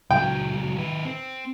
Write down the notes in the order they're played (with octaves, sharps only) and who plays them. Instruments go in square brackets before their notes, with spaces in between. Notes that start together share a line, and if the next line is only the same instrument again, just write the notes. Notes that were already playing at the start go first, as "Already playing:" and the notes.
[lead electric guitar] C#2 F#3 [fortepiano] G5
[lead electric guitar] D#3 B4
C4